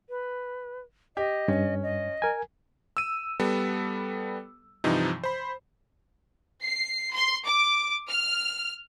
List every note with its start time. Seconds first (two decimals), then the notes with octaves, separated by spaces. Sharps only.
0.09 B4
1.17 G4 D#5
1.48 G2 C#4
1.83 D#5
2.22 A#4 G#5
2.97 E6 D#7
3.40 G3 B3 A4
4.84 G2 C3 E3 F3 D#4
5.24 C5 B5
6.63 C7
7.14 C6
7.46 D6
8.10 F6